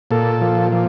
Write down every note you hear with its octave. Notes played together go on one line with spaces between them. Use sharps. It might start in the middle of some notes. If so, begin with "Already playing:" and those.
A#2 A4
F3
F3